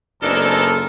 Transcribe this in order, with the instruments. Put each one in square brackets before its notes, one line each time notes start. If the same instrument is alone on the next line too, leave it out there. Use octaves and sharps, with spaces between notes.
[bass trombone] F#1 [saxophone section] G#3 C4 D4 [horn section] B3 D#4 A4 [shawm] A#4